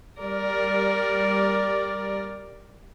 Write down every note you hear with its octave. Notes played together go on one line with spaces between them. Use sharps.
G3 A#4 D5